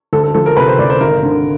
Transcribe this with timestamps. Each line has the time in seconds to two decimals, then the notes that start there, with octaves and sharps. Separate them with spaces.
0.13 D2 A4
0.23 A4
0.34 F3 A4
0.46 A#4
0.57 C3 B4
0.68 C5
0.79 D2 D5
0.90 C5
1.00 G#1 A#4
1.23 D3